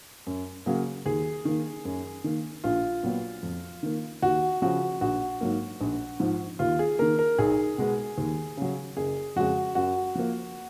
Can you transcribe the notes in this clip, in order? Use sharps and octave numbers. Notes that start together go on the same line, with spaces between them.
F#2
C#3 F#3 A#3
D#2 G#4
D#3 A#3
F#2
D#3 A#3
A#1 F4
A#2 F#3 B3
F2
D#3 A#3
D#2 F#4
C#3 F3 F#4
A#1 F#4
G#2 F#3 A#3
A#1
G#2 F3
D#2 F4
G#4
D#3 A#3 A#4
A#4
B1 G#4
B2 G#3 B3
D#2
C#3 F#3
F#1 G#4
F2 C#3 G#3 F#4
F#2 F#4
F3 A#3